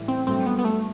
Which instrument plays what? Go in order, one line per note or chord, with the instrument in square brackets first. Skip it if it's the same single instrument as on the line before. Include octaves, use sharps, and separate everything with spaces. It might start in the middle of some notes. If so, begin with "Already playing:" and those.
Already playing: [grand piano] A2 E3 G3
[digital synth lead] C4
[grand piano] G2 F#3 A3 [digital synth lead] C4
[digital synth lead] B3
B3
A3